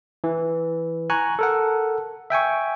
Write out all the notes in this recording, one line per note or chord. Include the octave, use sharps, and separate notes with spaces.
E3
G#5 A#5 C#6 F#6
A4 A#4 F#5
E5 G5 G#5 C#6